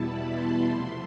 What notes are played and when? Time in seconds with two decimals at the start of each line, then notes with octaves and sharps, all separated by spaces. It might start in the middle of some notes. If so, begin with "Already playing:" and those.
Already playing: E2 B2 G3 B3 E4 A5 B5
0.29 C6
0.65 C3 F3 A3